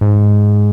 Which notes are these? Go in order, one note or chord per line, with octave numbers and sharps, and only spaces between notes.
G#2